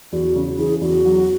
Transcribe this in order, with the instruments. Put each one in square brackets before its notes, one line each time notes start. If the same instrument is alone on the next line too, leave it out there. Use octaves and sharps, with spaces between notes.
[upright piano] E2 [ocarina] F#4
[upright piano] C#3
[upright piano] E3 [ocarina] G#4
[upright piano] E2 [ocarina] F#4
[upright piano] F#3